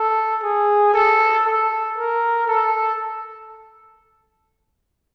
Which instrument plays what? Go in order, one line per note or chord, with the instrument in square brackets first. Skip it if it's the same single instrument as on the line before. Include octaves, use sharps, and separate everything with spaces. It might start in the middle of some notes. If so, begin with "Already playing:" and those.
Already playing: [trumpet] A4
G#4
A4
A4
A#4
A4